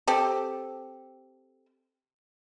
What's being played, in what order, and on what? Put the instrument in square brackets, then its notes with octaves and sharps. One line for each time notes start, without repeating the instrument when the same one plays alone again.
[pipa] C4 G4 A4